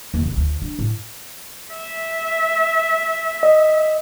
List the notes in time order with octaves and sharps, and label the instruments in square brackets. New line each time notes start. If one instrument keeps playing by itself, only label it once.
[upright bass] D#2
E1
D2
D4
A2
[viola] E5
[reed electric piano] D#5